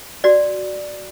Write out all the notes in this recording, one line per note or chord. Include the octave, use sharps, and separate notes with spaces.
F#4 D5